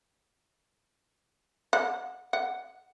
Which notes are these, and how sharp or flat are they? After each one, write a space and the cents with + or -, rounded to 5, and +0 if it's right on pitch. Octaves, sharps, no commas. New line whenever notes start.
F#5 -20
F#5 +10